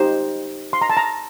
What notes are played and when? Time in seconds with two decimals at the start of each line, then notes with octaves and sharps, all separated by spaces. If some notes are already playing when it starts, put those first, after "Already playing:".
Already playing: D#4 G4 C5
0.73 C6
0.82 A#5
0.90 A5
0.97 A#5